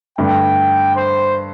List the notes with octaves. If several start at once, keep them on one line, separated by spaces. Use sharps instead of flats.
G2 D3 A3 G5
C5